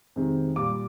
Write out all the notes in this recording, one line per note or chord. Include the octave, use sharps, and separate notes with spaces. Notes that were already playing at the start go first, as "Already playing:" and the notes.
F2 C3 D#3 G#3
A#2 G3 D6